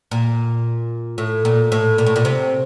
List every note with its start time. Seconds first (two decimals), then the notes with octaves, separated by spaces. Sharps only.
0.11 A#2
1.18 A2
1.45 A#2
1.72 A2
1.98 A#2
2.06 A2
2.16 A#2
2.25 C3